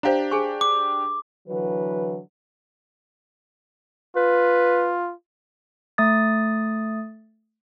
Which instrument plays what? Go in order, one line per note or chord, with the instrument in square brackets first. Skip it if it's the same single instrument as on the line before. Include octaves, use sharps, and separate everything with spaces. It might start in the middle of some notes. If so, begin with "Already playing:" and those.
[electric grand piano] D4 G4 [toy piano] C5 F5 A#5
[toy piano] G#4 G#5 C#6
[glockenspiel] D6
[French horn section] D3 E3 F#3 B4
[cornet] F4 [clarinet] B4
[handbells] A3 D#6 A6